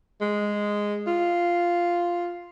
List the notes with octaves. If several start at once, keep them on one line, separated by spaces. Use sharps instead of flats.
G#3
F4